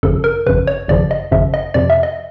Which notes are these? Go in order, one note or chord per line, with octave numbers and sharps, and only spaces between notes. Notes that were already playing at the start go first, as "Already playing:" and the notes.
G#1 F#2 C#3 F3 A4
A#4
G#1 F#2 C#3 F3 B4
C#5
G#1 F#2 C#3 F3 D5
D#5
G#1 F#2 C#3 F3 E5
D#5
F2 C3 F3 D5
E5
D#5